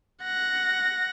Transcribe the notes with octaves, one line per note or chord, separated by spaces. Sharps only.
F#5 A#6